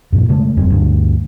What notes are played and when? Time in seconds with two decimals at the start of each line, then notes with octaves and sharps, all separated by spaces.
0.13 F#2 A#2 F3
0.29 C#3 G#3 A3
0.57 E1 F#2 C4
0.70 D2 G2